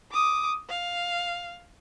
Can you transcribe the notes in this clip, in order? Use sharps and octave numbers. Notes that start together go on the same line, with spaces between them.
D6 D#6
F5